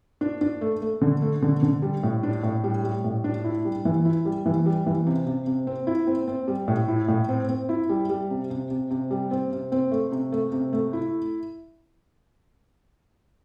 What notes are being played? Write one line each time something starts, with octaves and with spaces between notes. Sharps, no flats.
D4
D4
A3
A3
D3
A3
D3
D3
G3
A2
D4
A2
G3
G3
A2
D4
E4
G3
E3
E4
G3
E3
G3
E3
C3
C3
C3
C4
E4
C4
C4
G3
A2
E4
A2
C4
C4
E4
G3
G3
C3
C3
C3
C3
G3
C4
C3
C4
A3
C3
A3
C3
A3
E4